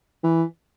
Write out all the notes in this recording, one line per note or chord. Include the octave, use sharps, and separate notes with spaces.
E3